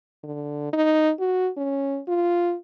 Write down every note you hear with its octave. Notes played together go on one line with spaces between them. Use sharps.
D3
D#4
F#4
C#4
F4